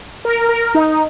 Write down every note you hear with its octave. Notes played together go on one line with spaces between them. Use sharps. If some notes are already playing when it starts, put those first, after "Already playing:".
A#4
A#4
D#4